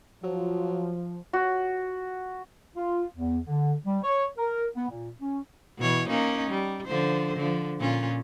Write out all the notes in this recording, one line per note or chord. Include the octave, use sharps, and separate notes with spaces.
F3 F#3
F#4
F4
E2
D3
G3
C#5
A#4
B3
A#2
C#4
B2 E3 C#5
A#3 C#4 D#4
G3
D3 F3 C5
D3 F3
A#2 C#4 F4